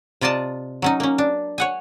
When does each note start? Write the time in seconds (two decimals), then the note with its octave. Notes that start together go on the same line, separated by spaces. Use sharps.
0.21 C3 F4 D5 D#5 A5
0.82 F#3 C#4 D#4
1.00 A#3 C#4
1.18 D4
1.58 C#5 F#5 G#5